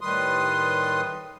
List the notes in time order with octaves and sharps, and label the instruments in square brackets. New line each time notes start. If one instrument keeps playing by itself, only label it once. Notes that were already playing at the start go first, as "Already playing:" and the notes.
[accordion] A2 D#3 G3 B4 C6 D#6